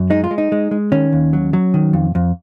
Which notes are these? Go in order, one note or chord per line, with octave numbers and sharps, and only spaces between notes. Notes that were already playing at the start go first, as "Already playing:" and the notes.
Already playing: F#2
G#3 D#4
F4
G#3
D#4
G#3
G#3
D#3 C#4
D#2
F#3
F#3
D#3
F2
F2